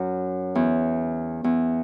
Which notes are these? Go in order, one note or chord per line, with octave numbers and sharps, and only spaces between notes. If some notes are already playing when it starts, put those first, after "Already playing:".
Already playing: F#2
E2
E2